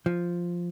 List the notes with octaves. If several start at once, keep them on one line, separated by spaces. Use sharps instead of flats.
F3